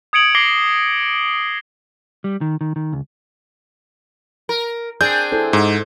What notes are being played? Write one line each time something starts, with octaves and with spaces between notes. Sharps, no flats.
D#6 G#6 C#7 D7 F#7
D6 A#6 C7 G7
G3
D#3
D#3
D#3
C#2
A#4
C4 D4 G#4 G6
E4 A4 C5
G#2